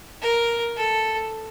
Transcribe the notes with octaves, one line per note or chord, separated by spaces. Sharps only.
A#4
A4